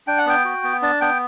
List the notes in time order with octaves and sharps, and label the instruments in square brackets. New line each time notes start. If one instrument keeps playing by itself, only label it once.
[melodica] D4 G5
F#5
B3 G5
F#4
B3
D4 A5
B3 G5